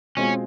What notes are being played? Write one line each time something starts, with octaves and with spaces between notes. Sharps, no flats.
B2 G#3 C4 C#4 F4